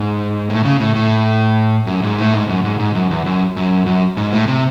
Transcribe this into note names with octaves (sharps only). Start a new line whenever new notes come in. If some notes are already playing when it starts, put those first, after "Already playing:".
Already playing: G#2
A2
C#3
A2
A2
F#2
G#2
A2
G#2
F#2
G#2
G#2
F#2
E2
F#2
F#2
F#2
G#2
A2
C3